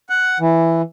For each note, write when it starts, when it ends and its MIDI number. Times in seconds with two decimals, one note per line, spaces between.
0.10 0.38 78
0.40 0.82 52